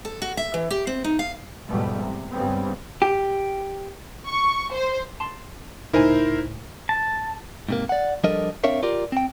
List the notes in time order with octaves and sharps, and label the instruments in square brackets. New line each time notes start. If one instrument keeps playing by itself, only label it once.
[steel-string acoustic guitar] A4
F#4
E5
E3
G4
C4
D#4
F5
[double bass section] E2 G#2 B2 F3 G3 A3
C3
C#2 G2 C#3 G3 B3 C4
[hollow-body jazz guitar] G4
[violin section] C#6
C5
[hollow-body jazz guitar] A5 C6
[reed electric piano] C#2 A2 [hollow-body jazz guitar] D#4 G#5 [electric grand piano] E4 A#4 C5
[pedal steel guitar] A5
[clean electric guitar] G#2 C3 A#3
D5 F#5
F3 G3 D4 A4 A#4 D#5
C4 D4 A#4 C#5 E5 F5
F4 G4 A#4 D5
C4 G5